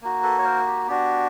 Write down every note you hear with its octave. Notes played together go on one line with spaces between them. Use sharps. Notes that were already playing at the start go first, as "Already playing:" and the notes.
A#3 D#4 F#4
A4 B4
C#5
A#4 C5
G4
B3 D4 F#4 G4